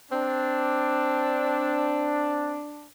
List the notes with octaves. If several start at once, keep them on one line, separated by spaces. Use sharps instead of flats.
C4 D4